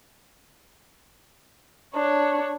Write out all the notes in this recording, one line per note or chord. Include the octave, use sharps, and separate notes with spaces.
D4 C#5